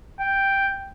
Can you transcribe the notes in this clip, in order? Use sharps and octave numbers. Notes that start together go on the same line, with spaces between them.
G5